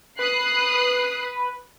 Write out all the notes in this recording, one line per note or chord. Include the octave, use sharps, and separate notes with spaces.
B4 D#6 F#6 C7